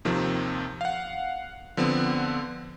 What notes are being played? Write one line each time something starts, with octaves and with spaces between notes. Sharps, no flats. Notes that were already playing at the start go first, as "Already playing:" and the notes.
D#2 C3 D#3 F3 C4
F5 F#5
D3 F3 B3 C4